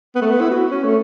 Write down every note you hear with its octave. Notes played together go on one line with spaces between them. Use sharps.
B3
A3
B3
E4
F#4
C#4
A3